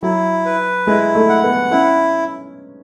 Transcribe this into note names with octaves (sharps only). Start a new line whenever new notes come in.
F#3 E4
B4
G#3 E4
A3
F#5
B3
C#4 E4